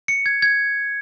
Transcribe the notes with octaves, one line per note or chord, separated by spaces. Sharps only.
C#7
G#6
G#6